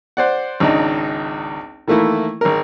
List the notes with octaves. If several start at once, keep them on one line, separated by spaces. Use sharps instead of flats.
C5 D5 F#5
G#1 C#2 D4 D#4
D#3 E3 A3 A#3 E4
G#1 A#4